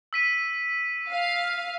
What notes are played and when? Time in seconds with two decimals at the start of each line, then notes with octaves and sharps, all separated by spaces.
0.13 E6 B6 D#7
1.10 F5